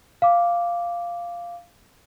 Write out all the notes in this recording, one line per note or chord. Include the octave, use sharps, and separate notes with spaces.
F5 D6